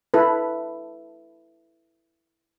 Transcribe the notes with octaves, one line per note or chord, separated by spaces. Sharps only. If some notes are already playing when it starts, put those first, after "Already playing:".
E4 A4 B4